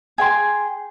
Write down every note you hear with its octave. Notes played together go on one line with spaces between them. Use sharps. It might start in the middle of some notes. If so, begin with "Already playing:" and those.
G#4 G5 C6